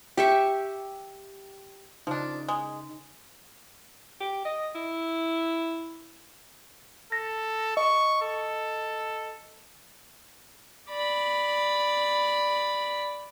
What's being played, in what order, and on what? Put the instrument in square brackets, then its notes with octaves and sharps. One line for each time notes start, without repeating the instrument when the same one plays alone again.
[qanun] G4 E5 C#6
[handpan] C#3 D#4 [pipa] F3 D4
[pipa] G#3
[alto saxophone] G4
D#5
E4
[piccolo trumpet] A4 [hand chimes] A#6
[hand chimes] D#5 [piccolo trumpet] C#6
[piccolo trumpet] A4
[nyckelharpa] D5 B5